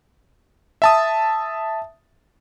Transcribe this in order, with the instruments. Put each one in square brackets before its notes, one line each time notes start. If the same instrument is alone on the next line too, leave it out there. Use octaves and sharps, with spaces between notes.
[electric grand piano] E5 A5 D#6